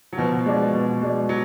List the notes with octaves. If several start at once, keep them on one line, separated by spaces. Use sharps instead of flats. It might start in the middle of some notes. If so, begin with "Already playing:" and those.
F#3
B2 F3
G#3 D4
B2
G#3 D4
F#3